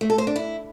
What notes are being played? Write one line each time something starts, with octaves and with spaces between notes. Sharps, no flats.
A3
A4
C5
D4
E4